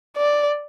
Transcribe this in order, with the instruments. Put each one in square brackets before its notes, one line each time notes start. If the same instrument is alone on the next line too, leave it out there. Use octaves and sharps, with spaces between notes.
[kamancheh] D5